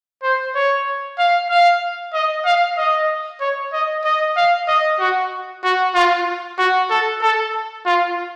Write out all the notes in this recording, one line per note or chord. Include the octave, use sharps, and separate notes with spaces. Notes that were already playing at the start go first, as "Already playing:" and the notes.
C5
C#5
F5
F5
D#5
F5
D#5
C#5
D#5
D#5
F5
D#5
F#4
F#4
F4
F#4
A4
A4
F4